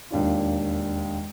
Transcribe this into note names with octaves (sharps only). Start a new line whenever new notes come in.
E1 D#2 D4 F4